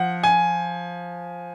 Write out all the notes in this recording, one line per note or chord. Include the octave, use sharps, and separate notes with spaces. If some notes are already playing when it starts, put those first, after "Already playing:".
Already playing: F3 F#5
G#5